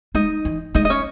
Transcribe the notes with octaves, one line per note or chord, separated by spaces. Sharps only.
G#3 D#4 D#5
E3
G#3 D#4 D#5
D#5
C#4 C#5